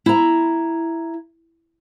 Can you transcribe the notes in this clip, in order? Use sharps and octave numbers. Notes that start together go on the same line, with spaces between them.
E4 A#5